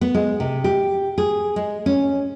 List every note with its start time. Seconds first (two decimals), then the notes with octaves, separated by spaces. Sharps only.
0.01 B3
0.14 G#3
0.40 C3
0.64 G4
1.18 G#4
1.56 G#3
1.86 C#4